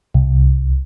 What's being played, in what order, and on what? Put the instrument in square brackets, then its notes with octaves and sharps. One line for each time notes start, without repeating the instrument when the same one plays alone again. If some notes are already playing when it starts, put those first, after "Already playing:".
[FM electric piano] C2